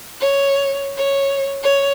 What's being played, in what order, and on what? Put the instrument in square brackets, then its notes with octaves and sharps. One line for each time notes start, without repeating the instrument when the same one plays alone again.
[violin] C#5
C#5
C#5